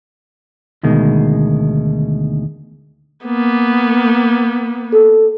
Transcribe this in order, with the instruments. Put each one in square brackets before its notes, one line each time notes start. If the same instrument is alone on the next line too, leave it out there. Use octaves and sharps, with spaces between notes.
[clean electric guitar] D2 B2 D#3 G#3
[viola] A#3 B3
[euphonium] A4